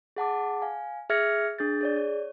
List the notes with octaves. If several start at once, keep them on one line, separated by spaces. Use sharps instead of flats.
G#4 F#5 A5 D6
F5 G#5
G#4 E5 F6 G#6 A#6 C#7
D4 G#4 G6 A6
G#4 C#5 D5
C#5